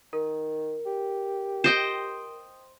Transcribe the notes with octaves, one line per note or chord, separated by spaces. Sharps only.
D#3 A#4
G4
C5 D#5 G5